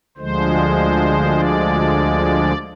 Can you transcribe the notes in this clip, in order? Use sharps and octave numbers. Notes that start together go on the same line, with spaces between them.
D2 D3 F3 G#3 C5
D5